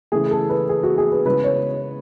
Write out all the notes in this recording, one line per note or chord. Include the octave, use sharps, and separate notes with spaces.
C#3 E3 A3 G#4
A4
B4
G#4
F#4
G#4
B4
C#3 G#3 B3 E4 B4
C#5